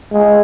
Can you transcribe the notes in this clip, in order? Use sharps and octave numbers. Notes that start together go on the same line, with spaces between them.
G#3